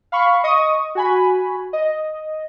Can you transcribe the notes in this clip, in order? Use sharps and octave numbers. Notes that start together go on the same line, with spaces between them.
F5 B5 C#6
D#5 C#6 D#6
F#4 G#5 B5
D#5